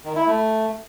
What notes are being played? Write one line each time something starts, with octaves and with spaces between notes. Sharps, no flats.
D#3
E4
A3